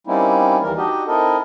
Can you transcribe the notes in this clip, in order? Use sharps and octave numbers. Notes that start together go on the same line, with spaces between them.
G3 A#3 C4 C#4 D#4 E4
D#2 E3 G3 A#4
D4 D#4 F#4 G4 D#5
C4 D#4 E4 A4 A#4 D#5